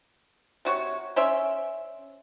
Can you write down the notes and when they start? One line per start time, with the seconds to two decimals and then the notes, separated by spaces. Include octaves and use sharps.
0.65 C3 F#4 C#5
1.16 C#4 C5 D5 E5